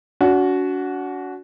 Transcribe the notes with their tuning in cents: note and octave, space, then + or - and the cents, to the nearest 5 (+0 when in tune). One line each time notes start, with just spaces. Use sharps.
D4 -45 F#4 +0